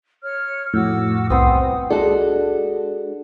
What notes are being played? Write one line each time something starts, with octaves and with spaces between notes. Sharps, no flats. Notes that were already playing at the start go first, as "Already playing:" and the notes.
C#5 F6
F2 A2 F#4 D6 E6
C2 B3 C4 C5 D6 D#6
G#3 D4 F#4 A4